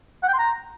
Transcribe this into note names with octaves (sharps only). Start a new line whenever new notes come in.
F#5
G5
C6
A#5